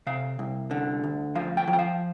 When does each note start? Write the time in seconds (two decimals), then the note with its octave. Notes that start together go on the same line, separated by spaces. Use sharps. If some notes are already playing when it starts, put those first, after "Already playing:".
0.07 C3 F5
0.39 C2
0.71 D3
1.04 D2
1.35 F3 F5
1.57 G5
1.68 F3
1.73 G5
1.79 F5